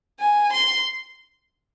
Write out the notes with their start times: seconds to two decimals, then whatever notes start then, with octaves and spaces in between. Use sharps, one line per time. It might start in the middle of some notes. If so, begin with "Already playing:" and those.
0.20 G#5
0.52 C6